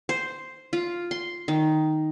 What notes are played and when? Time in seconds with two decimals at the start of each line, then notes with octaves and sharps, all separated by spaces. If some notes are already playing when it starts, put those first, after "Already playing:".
0.09 C5
0.73 F4
1.11 C6
1.48 D#3